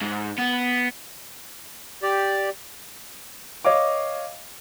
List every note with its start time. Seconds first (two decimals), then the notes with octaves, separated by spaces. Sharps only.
0.01 G#2
0.39 B3
2.03 G4 D5
3.65 C#5 D#5 F5 D6